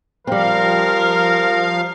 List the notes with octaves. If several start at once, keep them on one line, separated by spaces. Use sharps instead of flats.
F3 G3 C4 A#4 F5